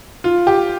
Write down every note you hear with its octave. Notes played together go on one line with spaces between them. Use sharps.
F4
G4